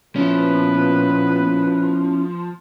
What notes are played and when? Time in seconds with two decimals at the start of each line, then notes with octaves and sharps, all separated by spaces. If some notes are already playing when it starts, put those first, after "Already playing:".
0.16 A#2 F3 B3 C#4 E4 B4